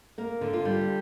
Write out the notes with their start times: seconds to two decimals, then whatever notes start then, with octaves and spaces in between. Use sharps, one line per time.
0.18 A#3 A#4
0.41 D3
0.53 F4
0.65 G3